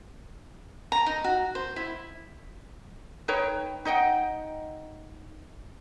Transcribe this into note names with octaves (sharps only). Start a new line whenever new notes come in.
A#5
D#4
F#4
C5
E4
D#4 B4 C#5 G5
D#4 D#5 F#5 G5